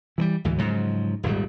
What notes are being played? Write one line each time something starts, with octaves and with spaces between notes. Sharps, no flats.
E3 F3 G3
D2 G#2 E3
G#2 C#3 F3 F#3
D#1 G#1 G#2 G3